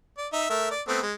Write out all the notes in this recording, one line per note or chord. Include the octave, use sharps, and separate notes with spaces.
D5
D#4 E5
A3 A#4 E5
D5
A3 B3 C4
G#3